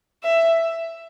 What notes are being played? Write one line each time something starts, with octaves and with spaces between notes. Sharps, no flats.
E5